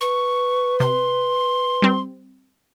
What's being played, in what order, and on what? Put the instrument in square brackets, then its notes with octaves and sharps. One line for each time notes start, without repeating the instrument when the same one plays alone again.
[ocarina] B4 [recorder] C#6
[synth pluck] C3 [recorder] C6
[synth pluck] G3 C4